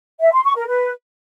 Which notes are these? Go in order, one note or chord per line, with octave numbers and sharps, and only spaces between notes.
E5
C6
C#6
A#4
B4